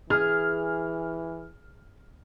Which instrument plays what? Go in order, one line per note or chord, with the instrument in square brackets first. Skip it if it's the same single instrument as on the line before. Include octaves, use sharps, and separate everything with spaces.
[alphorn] E3 [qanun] G#4 [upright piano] F6